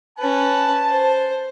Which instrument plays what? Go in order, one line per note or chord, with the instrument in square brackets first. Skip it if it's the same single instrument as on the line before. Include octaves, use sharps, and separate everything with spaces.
[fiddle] C#4 B4 [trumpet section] A5
[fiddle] C5